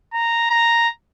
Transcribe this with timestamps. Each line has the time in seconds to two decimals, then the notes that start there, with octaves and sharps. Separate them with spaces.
0.14 A#5
0.50 A#5